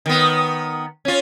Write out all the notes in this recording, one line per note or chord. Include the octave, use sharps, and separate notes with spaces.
D#3 B3
C#4 F4